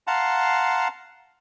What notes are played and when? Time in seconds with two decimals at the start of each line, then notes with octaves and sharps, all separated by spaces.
0.07 F5 F#5 A5 A#5 C6